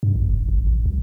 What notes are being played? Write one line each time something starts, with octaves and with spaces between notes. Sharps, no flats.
G2
A#1
F#1
A1
A1
C2